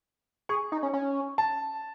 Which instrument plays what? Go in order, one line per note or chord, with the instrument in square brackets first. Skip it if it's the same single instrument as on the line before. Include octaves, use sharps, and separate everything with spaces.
[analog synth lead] G#4 [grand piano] C#6
[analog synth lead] D#4
C#4
C#4
[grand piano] A5